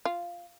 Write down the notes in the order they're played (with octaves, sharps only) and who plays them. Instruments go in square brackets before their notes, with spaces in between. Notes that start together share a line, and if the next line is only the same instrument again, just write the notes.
[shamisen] F4